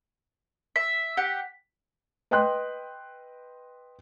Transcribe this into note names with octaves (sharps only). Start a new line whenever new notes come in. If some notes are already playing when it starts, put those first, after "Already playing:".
E5 B6
G4 F#5
B4 D#5 G5 C6 F#6